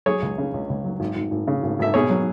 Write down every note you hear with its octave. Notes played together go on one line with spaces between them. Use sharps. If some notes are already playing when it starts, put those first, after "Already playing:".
F#3 G#4 C#5
C#2
C#3
C#2
C#2
F#3
G#1
G#1
G#1
C#3
G#1
G#1 E5
B2 G#4 C#5
F#3